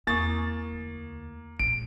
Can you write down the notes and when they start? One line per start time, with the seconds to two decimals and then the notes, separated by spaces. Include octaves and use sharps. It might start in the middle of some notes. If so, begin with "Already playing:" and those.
0.07 E2 A#3 C4 C#6 D#6 A6
0.72 D2
1.59 A#1 B2 D7